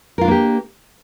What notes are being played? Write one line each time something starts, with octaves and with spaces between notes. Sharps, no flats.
A#3 D4 F4 G4 A#4